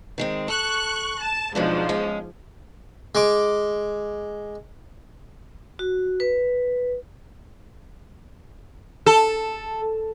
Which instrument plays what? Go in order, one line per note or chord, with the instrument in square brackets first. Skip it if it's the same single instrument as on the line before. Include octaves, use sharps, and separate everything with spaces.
[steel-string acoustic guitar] D#3 G#3 C4
[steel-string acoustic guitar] A4 [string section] C#6 F#6
[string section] A5
[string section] G#2 F3 [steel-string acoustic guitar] B2 F#3 D4
[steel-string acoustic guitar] G#3 C#4
[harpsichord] G#3 D6
[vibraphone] F#4
B4
[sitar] A4